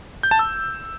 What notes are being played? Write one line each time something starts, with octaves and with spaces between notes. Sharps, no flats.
G6
A5
E6